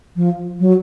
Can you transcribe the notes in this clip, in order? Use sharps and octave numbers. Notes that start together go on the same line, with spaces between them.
F3
F#3